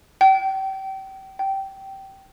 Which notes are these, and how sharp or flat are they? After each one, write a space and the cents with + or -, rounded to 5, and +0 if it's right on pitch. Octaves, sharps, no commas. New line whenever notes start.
G5 -30
G5 -15